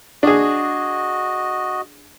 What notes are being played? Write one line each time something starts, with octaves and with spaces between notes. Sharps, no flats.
D4 F#4 G#4 D#5